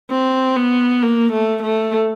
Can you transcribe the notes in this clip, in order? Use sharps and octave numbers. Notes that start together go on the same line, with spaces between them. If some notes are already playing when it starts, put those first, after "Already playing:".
C4
B3
A#3
A3
A3